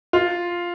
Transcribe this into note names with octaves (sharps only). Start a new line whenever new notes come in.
F4